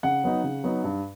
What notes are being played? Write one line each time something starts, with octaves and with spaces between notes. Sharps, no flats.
C#3 F#5
F#3 B3 D#4
C#3
F#3 B3 D#4
G2